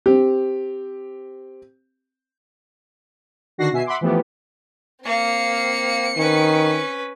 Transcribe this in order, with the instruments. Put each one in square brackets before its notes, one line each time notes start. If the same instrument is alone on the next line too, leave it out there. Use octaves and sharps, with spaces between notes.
[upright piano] C4 G4
[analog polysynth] D3 D#3 F#4 A#6 C7
B2 F#4 E5 G#5 C7
E5 F#5 B5 C6 D6
E3 F3 A3 B3 G4
[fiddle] A#3 F5 [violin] C4 C#7
[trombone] D#3 [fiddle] C#4 B4